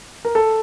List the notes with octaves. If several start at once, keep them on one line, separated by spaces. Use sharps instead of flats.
A#4
A4